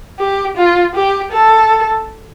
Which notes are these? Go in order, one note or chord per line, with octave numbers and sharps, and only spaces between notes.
G4
F4
G4
A4